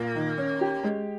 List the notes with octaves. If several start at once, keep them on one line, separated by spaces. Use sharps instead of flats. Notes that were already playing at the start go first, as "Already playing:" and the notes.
Already playing: A#2 A#3
D#3
C#4
G4
G#3